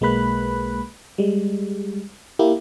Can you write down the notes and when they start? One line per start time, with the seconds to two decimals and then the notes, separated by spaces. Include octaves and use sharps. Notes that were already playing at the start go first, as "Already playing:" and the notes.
0.01 B1 G#3 A#3 B4 B5 F#6
1.18 G3 G#3
2.39 A#3 E4 G4